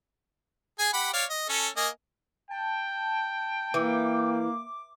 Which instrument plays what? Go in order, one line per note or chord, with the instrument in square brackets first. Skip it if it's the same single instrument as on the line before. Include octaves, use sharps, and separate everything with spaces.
[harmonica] G#4 G#5
G4 F#5 B5
C#5 D5 F5
D#5
C#4 A4
A#3 D#5 G#5
[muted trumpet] G5 [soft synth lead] A5
[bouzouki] E3 [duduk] A#3 [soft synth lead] D6